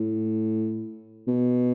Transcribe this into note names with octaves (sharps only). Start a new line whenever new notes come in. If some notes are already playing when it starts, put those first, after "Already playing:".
Already playing: A2
B2